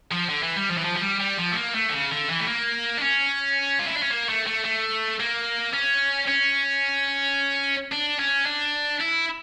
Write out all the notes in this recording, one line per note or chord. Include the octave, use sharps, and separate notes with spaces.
F3
D3
E3
G3
F3
E3
F3
F3
G3
G3
F3
A3
A#3
A3
D3
C#3
D3
E3
A3
A#3
D4
C#4
F4
E4
D4
C#4
A#3
A3
A3
A3
A#3
C#4
C#4
D4
C#4
D4
E4